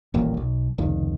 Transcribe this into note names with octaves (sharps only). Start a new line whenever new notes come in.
D#1 A1 D#2 A#2
B1
F1 C#2 D#3